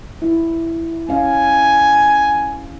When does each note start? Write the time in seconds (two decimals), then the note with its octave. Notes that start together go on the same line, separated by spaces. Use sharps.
0.22 E4
1.09 C#4 F5 G#5